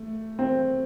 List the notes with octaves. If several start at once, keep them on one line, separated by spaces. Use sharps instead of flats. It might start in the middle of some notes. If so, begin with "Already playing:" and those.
Already playing: A3
C4